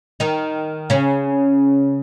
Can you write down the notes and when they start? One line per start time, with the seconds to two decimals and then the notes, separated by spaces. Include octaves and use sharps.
0.20 D#3 D#4
0.90 C#3 C#4